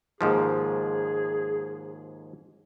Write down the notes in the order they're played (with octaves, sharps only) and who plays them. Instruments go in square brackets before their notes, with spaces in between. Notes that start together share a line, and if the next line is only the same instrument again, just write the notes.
[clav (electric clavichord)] D#2 G#2 F3 [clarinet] G#4